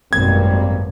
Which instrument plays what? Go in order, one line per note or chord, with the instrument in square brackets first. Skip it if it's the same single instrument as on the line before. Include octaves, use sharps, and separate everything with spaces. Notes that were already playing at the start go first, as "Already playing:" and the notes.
[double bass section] G#1 B2 [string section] F#2 [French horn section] G3 A#3 C4 [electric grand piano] G#6